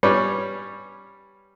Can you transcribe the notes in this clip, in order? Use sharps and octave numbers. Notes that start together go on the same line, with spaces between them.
G3 C#4 B4 C#5